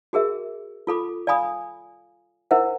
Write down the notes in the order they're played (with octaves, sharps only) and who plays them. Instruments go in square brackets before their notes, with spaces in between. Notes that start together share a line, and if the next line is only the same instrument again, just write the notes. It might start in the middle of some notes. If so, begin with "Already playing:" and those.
[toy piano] F#4 G#4 A#4 E5
F4 A4 B5 D6
D5 F5 G#5 B5 D#6
E4 A#4 C5 E5 F#5